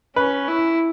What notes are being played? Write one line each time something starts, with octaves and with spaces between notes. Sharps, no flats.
C#4 B4
E4